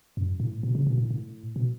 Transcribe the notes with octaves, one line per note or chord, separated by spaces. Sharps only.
F#2
A2
B2
C#3
B2
A2
A2
B2